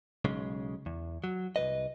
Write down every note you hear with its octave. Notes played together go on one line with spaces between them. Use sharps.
B1 C#3 G#3
E2
F#3
C2 C#3 B4 D#5